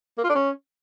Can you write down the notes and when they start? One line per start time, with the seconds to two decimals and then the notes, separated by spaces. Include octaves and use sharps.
0.18 A#3
0.24 F4
0.29 D4
0.35 C#4